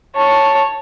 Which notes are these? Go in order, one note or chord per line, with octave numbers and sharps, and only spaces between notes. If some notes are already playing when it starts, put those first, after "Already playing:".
C#5 A5